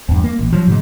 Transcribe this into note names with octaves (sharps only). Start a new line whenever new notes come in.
E2 G2
A#3
A1
F3 F#3
G#2 C#3 G#3